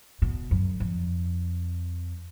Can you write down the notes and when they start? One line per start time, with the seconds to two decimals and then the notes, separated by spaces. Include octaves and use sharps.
0.22 B2
0.51 F#2
0.80 F2